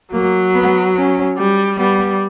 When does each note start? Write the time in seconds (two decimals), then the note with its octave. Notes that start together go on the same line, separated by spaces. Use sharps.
0.13 F#3 A#3
0.54 B3
0.97 C#4
1.37 G3
1.78 G3 B3